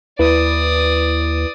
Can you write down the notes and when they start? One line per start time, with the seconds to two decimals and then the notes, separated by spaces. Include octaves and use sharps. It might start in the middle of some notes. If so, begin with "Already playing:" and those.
0.19 D#2 E4 B4 D5 D#6